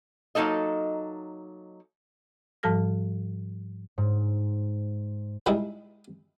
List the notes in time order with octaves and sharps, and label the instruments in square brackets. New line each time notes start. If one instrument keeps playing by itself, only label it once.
[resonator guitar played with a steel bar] F#3 A#3 D#4 A4 D#5
[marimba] G#2 F3 G3 A4 F6 A#6
[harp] G#2
[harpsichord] A#2 G3 G#3 D#4 E4